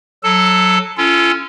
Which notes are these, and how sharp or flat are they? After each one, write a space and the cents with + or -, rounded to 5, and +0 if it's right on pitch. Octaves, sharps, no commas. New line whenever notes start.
F#3 +0 A4 +0 A5 +0
C#4 +0 F4 -35 A4 +0